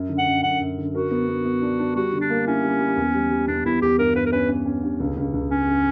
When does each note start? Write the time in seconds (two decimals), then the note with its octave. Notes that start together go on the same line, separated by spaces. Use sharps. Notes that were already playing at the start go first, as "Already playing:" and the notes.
Already playing: F#2
0.09 D3
0.18 F#5
0.27 F#2
0.43 F#2 F#5
0.60 F#2
0.78 D3
0.94 F#4 A#4
1.11 B3
1.29 B3
1.45 B3
1.62 D4
1.79 D4
1.96 G3 F#4
2.12 D3
2.21 D4
2.30 A#3
2.46 C#4 E4
2.63 G3
2.80 G3
2.97 E2
3.14 G3
3.31 G3
3.47 E2 D4
3.65 E2 E4
3.82 E2 G4
3.99 G2 A#4
4.15 G2 B4
4.26 A#4
4.32 C#4 B4
4.49 C#4
4.65 C#4
4.83 G2
5.00 C#2
5.16 C#2
5.33 C#2
5.50 C#3 C#4
5.67 C#3